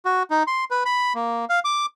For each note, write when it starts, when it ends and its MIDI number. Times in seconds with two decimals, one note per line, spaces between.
0.05 0.23 66
0.30 0.43 63
0.47 0.65 84
0.71 0.83 71
0.86 1.13 83
1.15 1.45 58
1.50 1.60 77
1.65 1.86 86